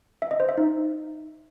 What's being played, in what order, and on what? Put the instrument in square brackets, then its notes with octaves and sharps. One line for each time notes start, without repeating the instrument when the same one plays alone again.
[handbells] E5
D#5
C5
E5
D#4